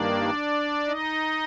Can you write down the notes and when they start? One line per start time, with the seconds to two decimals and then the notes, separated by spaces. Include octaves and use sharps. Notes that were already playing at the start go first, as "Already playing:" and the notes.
Already playing: G2 D#3 A#3 D4 D5
0.86 D#4 D#5